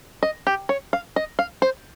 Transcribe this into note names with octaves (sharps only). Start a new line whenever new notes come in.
D#5
G4
C#5
F5
D#5
F5
C5